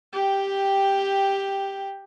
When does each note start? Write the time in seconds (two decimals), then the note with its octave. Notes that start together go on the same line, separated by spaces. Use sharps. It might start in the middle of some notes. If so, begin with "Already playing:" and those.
0.13 G4 G5